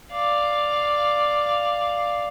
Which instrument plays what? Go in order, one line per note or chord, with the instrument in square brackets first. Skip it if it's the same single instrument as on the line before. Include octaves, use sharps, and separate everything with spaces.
[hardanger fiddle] D5 F5